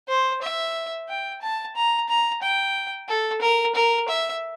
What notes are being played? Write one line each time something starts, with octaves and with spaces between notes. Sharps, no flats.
C5
E5
G5
A5
A#5
A#5
G5
A4
A#4
A#4
E5